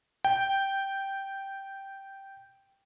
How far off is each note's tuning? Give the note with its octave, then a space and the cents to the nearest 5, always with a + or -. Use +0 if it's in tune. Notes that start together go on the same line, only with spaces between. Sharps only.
G5 -5